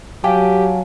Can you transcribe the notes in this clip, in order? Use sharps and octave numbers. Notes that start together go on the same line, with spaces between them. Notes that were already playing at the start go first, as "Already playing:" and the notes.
F#3 G4 F5 G#5 A5